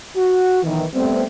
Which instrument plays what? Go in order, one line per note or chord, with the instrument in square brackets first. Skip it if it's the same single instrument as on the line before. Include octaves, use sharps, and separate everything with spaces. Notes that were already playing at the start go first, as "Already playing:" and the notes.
[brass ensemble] F#4
B1 D#3 E3
G3 A3 B3 C4